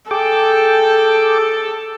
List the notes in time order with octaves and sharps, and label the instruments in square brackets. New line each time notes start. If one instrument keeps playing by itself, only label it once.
[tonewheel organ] G#4 G5 D6 [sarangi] A4